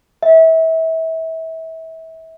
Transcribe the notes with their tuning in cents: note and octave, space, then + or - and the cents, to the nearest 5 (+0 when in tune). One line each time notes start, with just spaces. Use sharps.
E5 -30